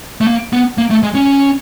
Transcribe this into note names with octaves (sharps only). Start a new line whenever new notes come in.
A3
A#3
B3
A#3
A3
G#3
C#4